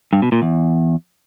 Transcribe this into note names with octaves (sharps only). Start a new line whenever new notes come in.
G2
B2
A#2
E2